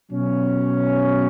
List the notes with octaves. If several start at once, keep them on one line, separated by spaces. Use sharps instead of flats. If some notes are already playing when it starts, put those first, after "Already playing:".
B2 F#3 C#4